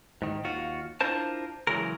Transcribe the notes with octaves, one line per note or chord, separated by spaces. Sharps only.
G#2 D#3
D#2 F4 F#4
D4 E4 F4 A#4 C5 A5
C#3 E3 F#3 G#3 A#4